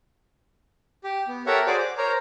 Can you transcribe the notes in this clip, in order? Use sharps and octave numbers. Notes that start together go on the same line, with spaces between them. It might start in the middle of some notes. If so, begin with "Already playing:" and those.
G4
B3
G4 A4 A#4 C#5 E5 F#5
F#4 G#4 C5 D5 D6
D6
A#4 C5 C#5 A#5